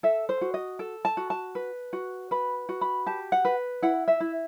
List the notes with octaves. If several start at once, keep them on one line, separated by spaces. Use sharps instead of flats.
A4 E5
C5
F#4
D#5
A4
A5
F#4
A5
B4
F#4
B4 B5
F#4
B5
G4 A5
F#5
B4
E4 F#5
E5
E4